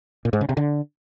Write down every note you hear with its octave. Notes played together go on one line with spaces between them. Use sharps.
A#2
G#2
C#3
C3
D3